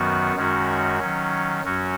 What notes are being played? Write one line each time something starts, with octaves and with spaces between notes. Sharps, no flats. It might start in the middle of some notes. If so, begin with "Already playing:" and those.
Already playing: F#2 D#3 F#3 B3 F#4
F#2 D#3 G#3 C#4 F#4
D#3 F#3 C#4
F#2 F#3 C#4 F#4